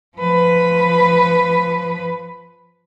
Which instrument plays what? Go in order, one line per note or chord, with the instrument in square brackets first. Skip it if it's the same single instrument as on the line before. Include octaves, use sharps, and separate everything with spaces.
[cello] F3 B4